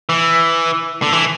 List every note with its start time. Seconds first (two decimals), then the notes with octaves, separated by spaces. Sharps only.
0.09 E3
1.02 D3
1.13 E3